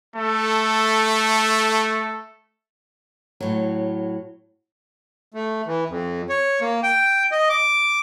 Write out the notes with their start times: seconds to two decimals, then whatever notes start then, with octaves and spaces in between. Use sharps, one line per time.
0.16 A3 A4
3.40 A2 F#3
5.34 A3
5.66 E3
5.90 F2
6.29 C#5
6.61 A#3
6.83 G5
7.32 D#5
7.49 D6